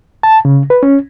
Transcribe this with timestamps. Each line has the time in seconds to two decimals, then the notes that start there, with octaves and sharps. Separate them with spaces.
0.23 A5
0.45 C#3
0.70 B4
0.83 C#4